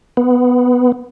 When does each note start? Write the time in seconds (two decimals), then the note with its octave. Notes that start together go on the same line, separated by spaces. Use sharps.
0.17 B3